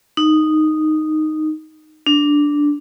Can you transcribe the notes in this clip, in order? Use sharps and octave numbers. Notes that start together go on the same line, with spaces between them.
D#4
D4